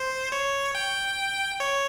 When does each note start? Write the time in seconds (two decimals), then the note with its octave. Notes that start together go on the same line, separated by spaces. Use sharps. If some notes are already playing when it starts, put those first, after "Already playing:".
Already playing: C5
0.32 C#5
0.75 G5
1.60 C#5